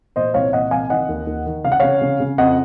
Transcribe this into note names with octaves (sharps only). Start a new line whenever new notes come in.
A#2 C5 D#5
C2 C#5 F5
A#2 D#5 F#5
C2 F5 G#5
D#3 D#5 F#5
D#2
D#2
D#3
C#3 F5
F#5
C#3 C#5 F5
C#3
C#3
F2 D#5 F#5